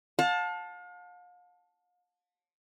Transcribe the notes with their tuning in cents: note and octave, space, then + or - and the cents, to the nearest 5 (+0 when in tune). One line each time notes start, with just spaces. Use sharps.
F5 +40 A5 +0